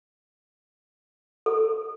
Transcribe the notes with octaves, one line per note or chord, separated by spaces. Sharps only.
A4